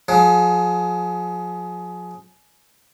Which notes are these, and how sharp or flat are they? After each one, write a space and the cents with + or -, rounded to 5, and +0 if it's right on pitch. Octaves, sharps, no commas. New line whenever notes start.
F3 +40 G#4 +25